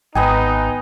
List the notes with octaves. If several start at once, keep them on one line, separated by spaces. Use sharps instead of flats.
G#1 B3 D#4 D#5 G5 G#5